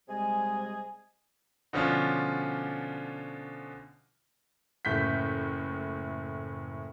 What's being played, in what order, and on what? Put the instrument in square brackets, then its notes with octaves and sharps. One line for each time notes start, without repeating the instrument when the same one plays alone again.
[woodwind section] C3 G3 G#3 G#4 D#5 G#5
[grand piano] B2 D3 F3 C#4 D4 F4
[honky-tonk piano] F#1 A2 G6 B6